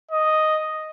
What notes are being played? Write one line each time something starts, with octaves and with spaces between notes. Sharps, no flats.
D#5